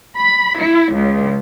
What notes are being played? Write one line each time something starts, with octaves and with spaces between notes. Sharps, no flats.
B5
E4
C#2